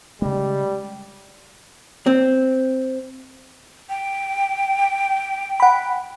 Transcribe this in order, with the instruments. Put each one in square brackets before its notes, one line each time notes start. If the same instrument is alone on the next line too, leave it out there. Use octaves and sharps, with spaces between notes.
[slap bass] C#3 G#3 [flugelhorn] G3
[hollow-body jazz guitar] C4
[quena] G5
[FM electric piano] F#5 B5